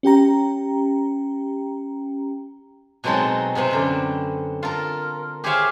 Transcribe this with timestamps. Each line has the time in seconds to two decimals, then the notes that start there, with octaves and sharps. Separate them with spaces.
0.03 C#4 G4 G5 A#5
3.04 B2 F#3 G#3 C4 D#4 A4
3.55 C3 B3 C4 C5
3.71 F#2 D3 G5
4.63 F4 A4 A#4
5.44 G4 G#4 C5 C#5 E5 F5